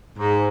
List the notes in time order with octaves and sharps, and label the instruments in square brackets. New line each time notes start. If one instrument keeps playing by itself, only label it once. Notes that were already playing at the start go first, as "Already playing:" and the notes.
[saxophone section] G#2